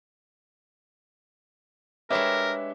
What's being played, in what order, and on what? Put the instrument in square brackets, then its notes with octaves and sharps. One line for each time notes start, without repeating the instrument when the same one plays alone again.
[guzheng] G#3 D4 G4 [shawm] A#4 [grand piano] B4 C#5 E5